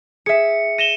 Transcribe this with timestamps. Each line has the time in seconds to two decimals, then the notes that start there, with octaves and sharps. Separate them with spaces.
0.26 G#4 E5 C#7
0.78 A#6 D#7 E7 G7